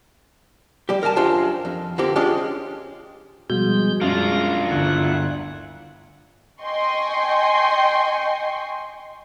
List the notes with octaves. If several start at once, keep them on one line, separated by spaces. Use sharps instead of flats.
G3 G4
D#3 A#4 F5 G#5 A5
F#2 D4 F4 G4 C5 A5
F2
D3 F3 A#3 C4 G4
G#3 C#4 D4 F4 G4
B2 F3 G3 G#3 F#4 G6
F#2 G#3 D4 F4 F5 A#6
G1 D2 E4 F#5
D#5 G5 G#5 C6 C#6